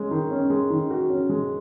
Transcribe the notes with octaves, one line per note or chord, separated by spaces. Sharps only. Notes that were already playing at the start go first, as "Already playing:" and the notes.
Already playing: G#3 C#4
D#3
C#4
G#3
D#3
F#4
C#4
G#3